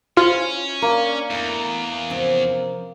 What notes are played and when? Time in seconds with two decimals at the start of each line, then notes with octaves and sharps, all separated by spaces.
0.17 C#4 E4 F4 B4 C5
0.82 A#3 D4
1.31 E2 A3 E4
2.10 C3 F3 C#4